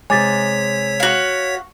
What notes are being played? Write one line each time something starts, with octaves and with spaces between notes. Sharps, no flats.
C3 G#3 C#5 G#5 D6 A6 B6
F#4 F5